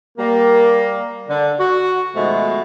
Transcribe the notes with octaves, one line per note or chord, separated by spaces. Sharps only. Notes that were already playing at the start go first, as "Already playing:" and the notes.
G3 A#3
D3
F#4
B2 D#3 F3 G#3 A3